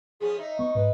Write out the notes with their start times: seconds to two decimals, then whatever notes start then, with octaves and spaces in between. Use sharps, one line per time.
0.20 F3 B3 C#4 G#4
0.38 D#4 E5
0.59 B3 C#6
0.75 G#2 B4